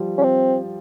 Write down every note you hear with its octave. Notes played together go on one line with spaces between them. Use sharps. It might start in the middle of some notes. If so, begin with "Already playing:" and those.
Already playing: F3 G3
C#4
C4